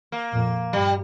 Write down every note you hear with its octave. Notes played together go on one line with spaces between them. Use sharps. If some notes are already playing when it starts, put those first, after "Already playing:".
A#3
F2 A#2
G2 G3